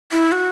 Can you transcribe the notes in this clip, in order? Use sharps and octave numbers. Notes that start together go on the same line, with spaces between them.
E4
F#4